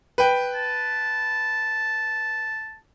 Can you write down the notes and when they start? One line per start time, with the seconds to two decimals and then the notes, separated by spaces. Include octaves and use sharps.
0.18 B4 G5
0.55 A5